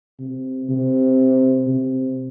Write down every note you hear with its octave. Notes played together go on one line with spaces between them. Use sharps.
C3
C3
C3